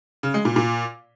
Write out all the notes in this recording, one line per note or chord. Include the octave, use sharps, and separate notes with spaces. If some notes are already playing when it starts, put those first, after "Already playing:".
C#3
G#3
A#2
A#2